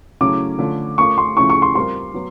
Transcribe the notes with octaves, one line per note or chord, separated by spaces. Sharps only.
C#3 F#3 A3 C#4 E4 D6
D3 F3 A3 C#4 F4
A3 C#4 F4 A#4 C#6
C6
C#3 F3 A3 C#4 E4 C#6
C#6
C6
G3 C4 F4 A#4 C6
F#3 B3